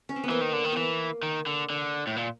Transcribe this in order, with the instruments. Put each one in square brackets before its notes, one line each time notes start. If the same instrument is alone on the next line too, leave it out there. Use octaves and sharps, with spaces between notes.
[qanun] C#4
C4
B3
[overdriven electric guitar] E3 [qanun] A#3
[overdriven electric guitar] D#3
D3
D#3
[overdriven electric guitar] E3 [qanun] A#3 B3
[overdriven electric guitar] D#3
D3
D3
A2
A#2